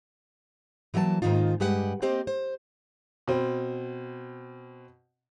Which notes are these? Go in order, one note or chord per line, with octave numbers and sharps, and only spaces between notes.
E3 F#3 A#3 D#5 A5
G#2 D#3 A#3 D#4 F4
G2 G#3 G4 B4 F#5
A#3 C4 G4 C5 D#5
C5
B2 C4